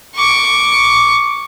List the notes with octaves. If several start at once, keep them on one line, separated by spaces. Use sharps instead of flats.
C#6 D6